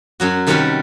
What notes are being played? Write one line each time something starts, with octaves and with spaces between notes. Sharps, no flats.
F#2 F#3 F#4
C3 D#3 G3 C#4 F#4 B4